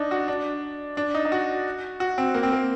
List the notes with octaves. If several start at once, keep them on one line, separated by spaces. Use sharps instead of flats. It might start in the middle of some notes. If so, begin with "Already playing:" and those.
Already playing: D4 D#4
F#4
D4
D4
D#4
D#4
F#4
F#4
C4
A#3
C4
A#3